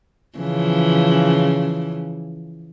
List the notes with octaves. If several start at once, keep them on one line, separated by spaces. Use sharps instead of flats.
C#3 E3 F3